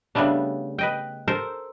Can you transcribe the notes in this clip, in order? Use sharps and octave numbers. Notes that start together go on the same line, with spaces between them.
C#3 G3 A3 B3 D4
B4 D#5 G5
A4 A#4 C5